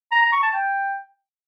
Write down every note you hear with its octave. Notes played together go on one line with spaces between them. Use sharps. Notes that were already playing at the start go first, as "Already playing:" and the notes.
A#5
A#5
C#6
A5
G5